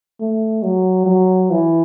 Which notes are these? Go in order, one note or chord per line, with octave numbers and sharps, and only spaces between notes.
A3
F#3
F#3
E3